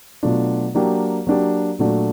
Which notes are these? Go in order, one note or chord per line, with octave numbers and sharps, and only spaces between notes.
B2 F#3 A3 D4 F4
F#3 A#3 D4 G4
F#3 A#3 D4 G4
A#2 F#3 A3 D4 F#4